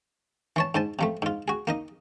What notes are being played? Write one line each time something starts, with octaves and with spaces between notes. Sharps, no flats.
E3 C#5 A5
G#2 C5 G#5 A5
C3 F3 A3
G#2 F4
F#4 G#4
A#3 D#4 D#5